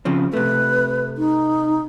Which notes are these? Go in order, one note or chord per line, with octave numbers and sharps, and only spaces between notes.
C#3 F3 C4
C3 A3 B4
D#4